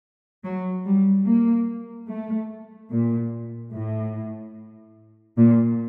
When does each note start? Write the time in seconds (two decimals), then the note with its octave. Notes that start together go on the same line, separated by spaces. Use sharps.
0.44 F#3
0.86 G3
1.26 A#3
2.09 A3
2.91 A#2
3.73 A2
5.37 A#2